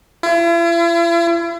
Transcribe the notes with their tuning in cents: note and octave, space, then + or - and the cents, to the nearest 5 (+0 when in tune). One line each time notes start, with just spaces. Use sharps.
E4 +45